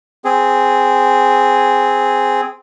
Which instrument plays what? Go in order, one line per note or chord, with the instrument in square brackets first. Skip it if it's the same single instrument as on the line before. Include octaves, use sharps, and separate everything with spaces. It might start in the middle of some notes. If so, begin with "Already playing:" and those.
[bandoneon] C4 G#4